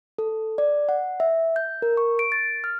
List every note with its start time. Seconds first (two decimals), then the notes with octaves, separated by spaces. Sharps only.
0.18 A4
0.58 D5
0.89 F#5
1.20 E5
1.56 G6
1.82 A#4
1.97 C#6
2.19 D7
2.32 A6
2.64 F6